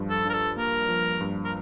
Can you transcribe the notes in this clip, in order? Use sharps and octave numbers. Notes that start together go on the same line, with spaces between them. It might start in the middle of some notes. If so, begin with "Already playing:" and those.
Already playing: G2 F3
A4
D4 A#4
A4
A#3 A#4
F3
G2
A#4